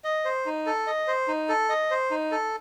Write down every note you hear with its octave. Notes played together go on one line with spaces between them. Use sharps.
D#5
C5
D#4
A4
D#5
C5
D#4
A4
D#5
C5
D#4
A4